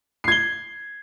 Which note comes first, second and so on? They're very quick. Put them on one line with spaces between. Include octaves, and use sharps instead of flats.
C7 G#6 G7